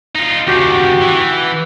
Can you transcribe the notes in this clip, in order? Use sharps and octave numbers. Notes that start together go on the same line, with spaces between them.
D#4 F4
D#2 C#3 F#4 G4
E3